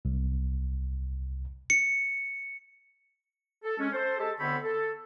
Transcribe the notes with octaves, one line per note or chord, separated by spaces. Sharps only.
C2
C#7
A4
G#3 C#4
A4 C5
G#3 G4 A4 A5
D2 D3 B3 C4 C#5 B5
A4